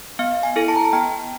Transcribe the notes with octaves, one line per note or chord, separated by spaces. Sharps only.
B3 F5
G#5
E4 A4
A5
A#5
A5
B3 G5